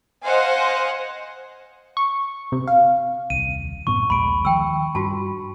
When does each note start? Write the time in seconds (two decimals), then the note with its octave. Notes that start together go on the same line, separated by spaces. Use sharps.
0.24 C5 D#5 F5 F#5 G#5
1.97 C#6
2.52 C3
2.67 F5
3.30 D#1 C2 D#7
3.87 G2 A#2 B3 C#6
4.10 A#1 D#2 G#3 B5 D7
4.45 D#3 F3 G#3 G5 E6
4.95 G2 F4 F#4 A5